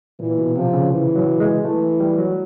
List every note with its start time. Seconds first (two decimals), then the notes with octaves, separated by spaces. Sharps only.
0.20 A#2 E3
0.38 B2
0.55 C3 F3
0.73 C#3
0.92 E3
1.16 F#3
1.40 G#3
1.64 E3 A3
2.00 G3
2.18 F#3